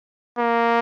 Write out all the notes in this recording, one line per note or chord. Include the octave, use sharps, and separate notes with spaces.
A#3